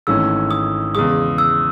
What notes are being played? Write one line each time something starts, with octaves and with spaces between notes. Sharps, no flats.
G#1 G#2 E3 A3 C#4 E6
D#6
E2 C#3 G#3 D#6
E6